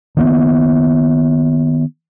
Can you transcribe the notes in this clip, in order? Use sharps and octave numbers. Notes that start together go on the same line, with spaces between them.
D#3 A#3 B3